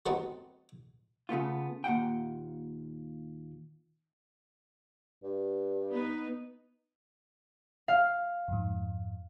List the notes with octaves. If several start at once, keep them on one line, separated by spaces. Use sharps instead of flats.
G3 A3 B3 C4 D#4 F#4
C#3 A3 B3 F4
D#2 A#2 F#5 G5
G2
B3 D#4 B4
F5
F2 G#2